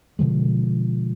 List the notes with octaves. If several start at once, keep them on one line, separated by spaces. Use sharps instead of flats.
B2 D3 F3 G#3